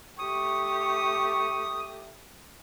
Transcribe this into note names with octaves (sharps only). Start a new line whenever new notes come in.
A3 G4 C#6 D#6